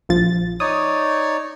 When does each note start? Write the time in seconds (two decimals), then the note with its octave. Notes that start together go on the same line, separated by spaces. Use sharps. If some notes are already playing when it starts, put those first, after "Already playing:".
0.09 A#1 F3 A6
0.60 D#4 C#5 D5 D#6